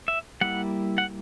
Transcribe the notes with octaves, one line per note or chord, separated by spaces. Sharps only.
E5
G3 A#3 E4 F#5
F#5